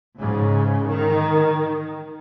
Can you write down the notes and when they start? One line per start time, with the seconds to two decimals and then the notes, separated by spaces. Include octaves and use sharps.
0.19 G#2 C#3
0.91 D#3